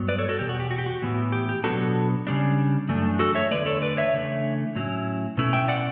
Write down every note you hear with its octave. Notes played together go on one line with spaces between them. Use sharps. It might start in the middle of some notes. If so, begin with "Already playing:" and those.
Already playing: G2 F#3 B3
B4 D5
A4 C#5
F#4 A4
E2 B2 G4
F#4
G4
F#4
G4
F#4
A2 E3 B3 E4
G4
G4
B2 F#3 B3 D4 F#4 A4
C#3 G3 D4
F#2 E3 A3 D4
F#4 A4
C#5 E5
E2 D3 A3 B4 D5
A4 C#5
B4 D5
C#5 E5
C#3 E3 A3 D4
A2 F#3 C#4 E4
B2 A3 C#4 E4
E5 G5
D5 F#5